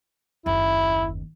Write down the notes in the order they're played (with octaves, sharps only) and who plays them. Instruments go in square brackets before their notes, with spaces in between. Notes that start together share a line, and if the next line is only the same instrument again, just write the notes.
[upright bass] F#1 D#2 [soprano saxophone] E4